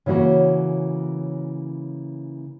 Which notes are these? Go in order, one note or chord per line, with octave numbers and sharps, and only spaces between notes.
C#3 E3 A#3 F#4 C#5